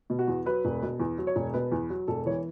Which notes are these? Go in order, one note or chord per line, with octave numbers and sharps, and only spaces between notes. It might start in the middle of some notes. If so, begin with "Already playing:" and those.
B2
F#4
E2
F#3 B4
E1
B2
E2
F#3
C#5
E1
B2 B4
E2
F#3
E1 A4
E3 C#5